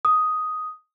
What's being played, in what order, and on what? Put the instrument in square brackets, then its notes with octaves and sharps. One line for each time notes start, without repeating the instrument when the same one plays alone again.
[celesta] D#6